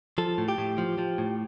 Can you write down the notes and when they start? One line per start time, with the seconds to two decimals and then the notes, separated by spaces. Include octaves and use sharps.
0.18 F3 A4
0.38 A2
0.49 G4
0.58 A2
0.78 F3
0.98 F3
1.18 A2